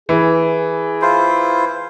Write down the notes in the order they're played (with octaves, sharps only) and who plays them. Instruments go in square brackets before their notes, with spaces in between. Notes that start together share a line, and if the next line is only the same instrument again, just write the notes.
[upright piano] E3 [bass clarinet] G#4
[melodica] E4 F4 C5